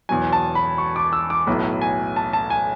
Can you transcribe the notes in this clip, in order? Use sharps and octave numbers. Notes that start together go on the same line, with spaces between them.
E1 E2 B2 F#3 G#5
A5
B5
C#6
D6
E6
D6
B1 A2 F#3 B3
G#5
A5
A5
G#5